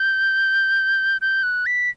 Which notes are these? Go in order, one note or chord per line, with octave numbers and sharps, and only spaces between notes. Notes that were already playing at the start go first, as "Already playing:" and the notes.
Already playing: G6
G6
F#6
B6